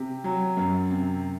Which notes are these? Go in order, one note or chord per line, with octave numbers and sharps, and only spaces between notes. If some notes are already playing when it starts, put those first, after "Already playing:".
Already playing: C3 G4
F#3
F#2
C3